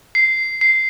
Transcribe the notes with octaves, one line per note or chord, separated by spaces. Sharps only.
C7
C7